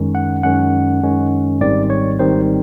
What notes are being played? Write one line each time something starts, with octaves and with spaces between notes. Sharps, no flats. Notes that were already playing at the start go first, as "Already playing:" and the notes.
Already playing: F#2 D#3 G#3 C#4
F#5
F#2 D#3 G#3 C#4 F#5
F#2 D#3 G#3 C#4
G#1 G#2 D#3 G3 C4 D5
C#5
G#1 G#2 D#3 G3 C4 C5